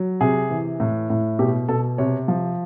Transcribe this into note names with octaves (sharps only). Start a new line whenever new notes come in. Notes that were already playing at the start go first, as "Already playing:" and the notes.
Already playing: F#3
C3 G#4
E3
A2
A2
B2 G4
B2 A4
C3 C#5
F3